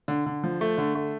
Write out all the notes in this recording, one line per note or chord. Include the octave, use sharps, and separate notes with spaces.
D3
D3
F3
A3
D3
A3